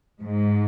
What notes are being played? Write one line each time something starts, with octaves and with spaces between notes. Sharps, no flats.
G#2